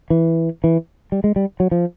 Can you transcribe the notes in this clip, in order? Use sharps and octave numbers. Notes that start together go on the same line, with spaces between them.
E3
E3
G3
G#3
G3
F#3
F3